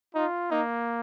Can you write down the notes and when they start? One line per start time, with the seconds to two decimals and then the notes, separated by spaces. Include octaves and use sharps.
0.15 D#4 F4
0.51 A#3 D#4